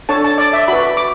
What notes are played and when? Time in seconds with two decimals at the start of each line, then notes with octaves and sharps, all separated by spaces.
0.09 D4 A4 C#5 A5
0.24 A5
0.38 D5
0.53 E5
0.68 F#4 B4 B5
0.97 D6